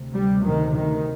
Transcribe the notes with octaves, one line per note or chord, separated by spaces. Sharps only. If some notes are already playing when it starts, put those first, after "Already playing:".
Already playing: D2 C3
G3
D#3
D#3